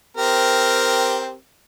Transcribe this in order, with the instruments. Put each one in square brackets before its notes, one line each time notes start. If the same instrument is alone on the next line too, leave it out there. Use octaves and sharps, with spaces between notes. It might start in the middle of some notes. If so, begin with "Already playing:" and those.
[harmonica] C4 G4 A#4